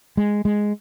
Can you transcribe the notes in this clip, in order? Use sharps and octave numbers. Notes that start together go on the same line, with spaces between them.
G#3
G#3